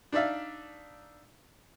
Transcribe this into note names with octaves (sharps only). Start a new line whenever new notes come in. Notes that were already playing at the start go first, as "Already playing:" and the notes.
D4 D#4 D5 E5 F5